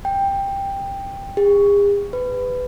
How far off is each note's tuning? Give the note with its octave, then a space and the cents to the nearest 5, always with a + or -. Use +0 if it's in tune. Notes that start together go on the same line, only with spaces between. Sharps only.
G5 +10
G#4 -45
B4 +20